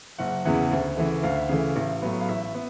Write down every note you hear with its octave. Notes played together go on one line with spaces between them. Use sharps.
F#1 F#5
E2 C#3 E3 F#5
D2
C#3 E3 A3
D2 F5
E5
C#3 E3 A3 F5
A1
A2 F#3 B3
F5
A1 E5
B3